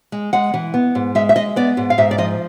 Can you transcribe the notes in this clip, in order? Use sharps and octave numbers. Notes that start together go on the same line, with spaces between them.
G#3
G#3 F#5
E3
B3
G#2
G#3 E5
E5
G#3 D#5
B3 D5
G#2
F5
G#2 E5
D5
F3 D#5